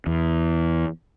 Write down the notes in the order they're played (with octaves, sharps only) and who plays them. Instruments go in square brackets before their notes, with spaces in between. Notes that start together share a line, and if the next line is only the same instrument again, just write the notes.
[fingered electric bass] E2